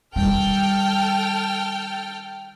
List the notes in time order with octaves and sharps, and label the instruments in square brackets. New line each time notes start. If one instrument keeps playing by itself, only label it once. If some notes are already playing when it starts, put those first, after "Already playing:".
[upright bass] D#3 G3 [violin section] A4 G5 F6